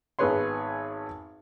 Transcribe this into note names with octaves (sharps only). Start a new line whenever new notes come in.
G#1 B3 G#4 B4 C#5 C6